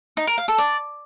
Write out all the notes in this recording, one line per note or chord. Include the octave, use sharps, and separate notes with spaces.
D#4
A#4
F5
A4
D5